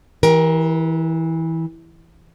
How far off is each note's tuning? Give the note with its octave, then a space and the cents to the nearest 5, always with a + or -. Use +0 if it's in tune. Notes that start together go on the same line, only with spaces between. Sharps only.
E3 -20 G4 +0 A#4 +20